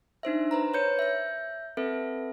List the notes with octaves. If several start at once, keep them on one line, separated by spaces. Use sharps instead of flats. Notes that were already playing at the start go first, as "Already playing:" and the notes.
D4 D#4 C5 E5
B4 C5 A#5
B4 C#5 G6 C#7
E5 G6
C4 A4 B4 E5